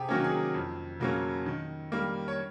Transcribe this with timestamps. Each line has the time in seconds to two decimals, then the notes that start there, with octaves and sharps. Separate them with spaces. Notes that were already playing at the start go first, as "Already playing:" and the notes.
Already playing: C3 G4 G#4
0.09 D#3 F#3 A#3 C#4
0.24 G#4
0.54 F2
1.00 C#3 F#3 A#3 C#4
1.46 D#3
1.92 G3 A#3
2.28 C#5